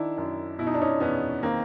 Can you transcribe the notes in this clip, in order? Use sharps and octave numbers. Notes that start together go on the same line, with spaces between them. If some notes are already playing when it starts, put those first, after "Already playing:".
Already playing: D#3 D4 E4
F#2
B2 E4
D#4
D4
C#4 D#4
E2 B3 C#4
D#3 A#3 C4